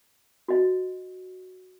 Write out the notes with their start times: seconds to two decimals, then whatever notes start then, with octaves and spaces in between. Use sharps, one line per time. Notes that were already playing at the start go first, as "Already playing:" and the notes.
0.48 F#4 D#5